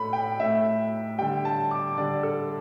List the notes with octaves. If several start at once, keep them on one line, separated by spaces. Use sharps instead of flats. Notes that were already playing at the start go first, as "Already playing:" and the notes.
Already playing: A2 A3 B5
G5
A2 A3 E5
D3 G3 G5
A5
D6
D3 G3 D5
A4